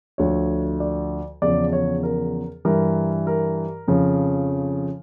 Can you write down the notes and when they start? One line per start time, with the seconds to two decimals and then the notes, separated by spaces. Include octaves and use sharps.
0.18 D2 D3 F3 C#5
0.80 D5
1.42 E2 C#3 F3 D5
1.73 C#5
2.03 A#4
2.65 G2 E3 A#4
3.27 A#4
3.88 F2 C#3 F3